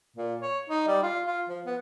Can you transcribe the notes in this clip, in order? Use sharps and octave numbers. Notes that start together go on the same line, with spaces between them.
A#2
C#5
D#4
G3
F4
F4
F3
B3